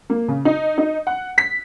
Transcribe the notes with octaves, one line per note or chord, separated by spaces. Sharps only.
A#3
C#3
D#4
D#4
F#5
B6